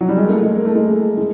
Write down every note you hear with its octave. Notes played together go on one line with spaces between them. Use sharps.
F#3
G3
G#3
A#3
A3
G#3
A#3
A3
G#3
A3
G#3